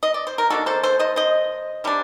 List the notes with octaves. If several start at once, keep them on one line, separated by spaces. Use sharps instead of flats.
D#5
D5
C5
A#4
D#3 G3 A#3 D4 F#4 A4
A4 C5
A4 C5
C5 D#5
C5 D#5
C3 G3 D4